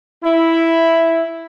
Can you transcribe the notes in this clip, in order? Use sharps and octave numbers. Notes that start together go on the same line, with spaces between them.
E4